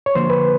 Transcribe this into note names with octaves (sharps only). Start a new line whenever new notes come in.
C#5
D3 F3 A#3 C5
B4